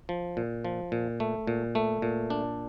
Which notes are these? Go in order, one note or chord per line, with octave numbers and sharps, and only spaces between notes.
F3
A#2
F3
A#2
A3
A#2
A3
A#2
D4